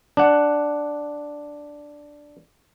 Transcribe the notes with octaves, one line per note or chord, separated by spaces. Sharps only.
D4 F#5